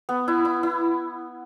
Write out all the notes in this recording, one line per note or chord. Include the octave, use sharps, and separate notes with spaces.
B3
E4
E4
E4